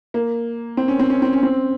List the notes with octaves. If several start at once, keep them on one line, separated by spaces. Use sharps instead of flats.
A#3
C4
C#4
C4
C#4
C4
C#4
C4